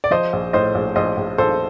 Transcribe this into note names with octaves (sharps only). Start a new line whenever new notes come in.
D5
F3 C5 D#5
A#1
A2 C5 D#5
A#1
A#1 C5 D#5
A#1
A#1 A4 C5